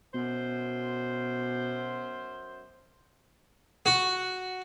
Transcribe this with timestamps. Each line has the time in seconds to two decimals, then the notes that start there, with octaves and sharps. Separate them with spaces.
0.14 F#2 B2 C5
3.86 F#4